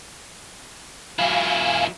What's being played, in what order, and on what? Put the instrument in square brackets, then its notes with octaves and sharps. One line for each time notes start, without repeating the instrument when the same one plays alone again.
[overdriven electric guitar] F#3 E4 [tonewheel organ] F5 G#5